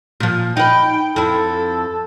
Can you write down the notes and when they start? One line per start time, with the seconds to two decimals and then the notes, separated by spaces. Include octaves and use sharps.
0.20 A#2 F3
0.57 D#4 B4 G5
1.16 F2 E4 A4